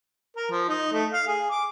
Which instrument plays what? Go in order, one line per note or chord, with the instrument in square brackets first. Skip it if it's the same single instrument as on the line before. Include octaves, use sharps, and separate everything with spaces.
[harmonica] A#4
F3
D#4
A3
F5
G#4
D6